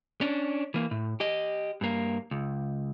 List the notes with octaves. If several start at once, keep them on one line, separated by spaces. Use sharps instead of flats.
C#4 D4
E3 A#3
A2
G4 D#5
G2 A#3
C#2